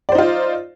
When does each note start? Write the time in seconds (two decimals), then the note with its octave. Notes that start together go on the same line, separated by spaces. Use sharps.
0.09 D5
0.12 C5
0.15 D#4
0.18 F4